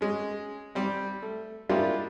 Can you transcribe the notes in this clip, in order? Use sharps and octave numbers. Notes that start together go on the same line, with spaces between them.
G#3 C#4
G3 C4
A3
G3 G#3 A#3 D4 E4 F4